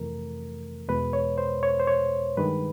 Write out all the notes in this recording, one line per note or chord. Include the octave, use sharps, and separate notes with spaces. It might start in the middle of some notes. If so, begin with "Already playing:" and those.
Already playing: F2 C3 E3 A3 A#4
E2 B2 G#3 B4
C#5
C5
C#5
C5
C#5
G2 D#3 G#3 B4